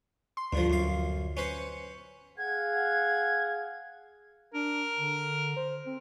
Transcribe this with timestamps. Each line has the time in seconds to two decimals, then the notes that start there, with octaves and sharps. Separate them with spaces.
0.37 C6
0.53 D2 G2 D3 F3
0.70 F#2 F5
1.37 C#4 B4 C5 C#7
2.38 G#4 F5 F#5 G#6
4.54 D4 A#4
4.98 D3
5.56 C5
5.86 C4